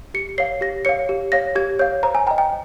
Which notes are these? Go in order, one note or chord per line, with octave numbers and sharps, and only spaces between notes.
G4 C#7
C#5 F5 C7
G4 A#6
C#5 F5 C#7
G4
C#5 F5 A#6
G4 G#6
C#5 F5 G6
C5 A#5
G#5
D#5 G5 A#5
G5